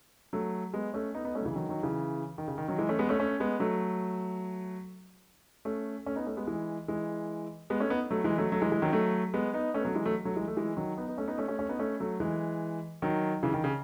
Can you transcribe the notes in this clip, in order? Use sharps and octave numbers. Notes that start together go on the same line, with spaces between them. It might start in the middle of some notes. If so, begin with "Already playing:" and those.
F#3 A3
G#3 B3
A3 C#4
B3 D#4
B3 D#4
A3 C#4
F#3
C#3 E3
D#3 F#3
D#3 F#3
C#3 E3
D#3
C#3
D#3
D#3 F#3
E3 G#3
A3 C#4
G#3 B3
A3 C#4
A3 C#4
G#3 B3
F#3 A3
A3 C#4
A3 C#4
B3 D#4
A3 C#4
G#3 B3
E3 G#3
E3 G#3
G#3 B3
A3 C#4
B3 D#4
F#3 A3
E3 G#3
F#3 A3
F#3 A3
E3 G#3
E3 G#3
D#3 F#3
F#3 A3
G#3 B3
B3 D#4
A3 C#4
B3
F#3 A3
E3 G#3
F#3 A3
F#3 A3
E3 G#3
A3
E3 G#3
D#3 F#3
B3 D#4
B3 D#4
A3 C#4
B3 D#4
A3 C#4
A3 C#4
A3 C#4
B3 D#4
A3 C#4
F#3 A3
E3 G#3
D#3 F#3
C#3 E3
D#3
C#3